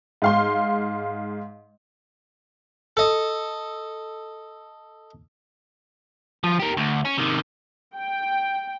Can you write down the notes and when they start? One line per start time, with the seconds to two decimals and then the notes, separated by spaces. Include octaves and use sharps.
0.22 G#2 F5 C6
2.97 A4 D#5
6.44 F3
6.60 G4 A#4
6.77 D2
7.05 C#4
7.18 C3 D#3
7.98 G5